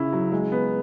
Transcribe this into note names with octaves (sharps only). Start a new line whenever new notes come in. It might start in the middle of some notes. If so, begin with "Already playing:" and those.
Already playing: C#3 C#4 E4
F#3
G#3
B3